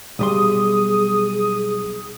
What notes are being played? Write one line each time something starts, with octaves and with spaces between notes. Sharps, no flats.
B1 G3 G#4 C6 D#6